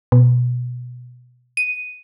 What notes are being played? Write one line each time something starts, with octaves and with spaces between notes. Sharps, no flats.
B2
D#7